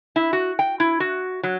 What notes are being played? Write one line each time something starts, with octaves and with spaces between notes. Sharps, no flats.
E4
F#4
G5
E4
F#4
F#3